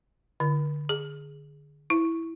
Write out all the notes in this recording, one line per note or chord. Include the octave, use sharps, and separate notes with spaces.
D3
G#4
E4